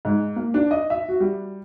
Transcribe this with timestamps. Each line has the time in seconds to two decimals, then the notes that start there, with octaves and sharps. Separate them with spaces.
0.05 G#2
0.36 A#3
0.54 D4
0.71 D#5
0.90 E5
1.09 F#4
1.20 G3